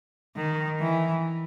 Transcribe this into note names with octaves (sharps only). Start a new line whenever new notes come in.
D#3
E3